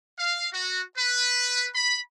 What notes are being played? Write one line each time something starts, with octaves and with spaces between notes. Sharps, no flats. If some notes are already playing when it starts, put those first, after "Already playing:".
F5
F#4
B4
B5